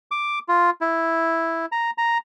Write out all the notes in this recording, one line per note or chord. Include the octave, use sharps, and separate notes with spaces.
D6
F4
E4
A#5
A#5